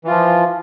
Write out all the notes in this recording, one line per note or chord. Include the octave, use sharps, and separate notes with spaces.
E3 F3 F4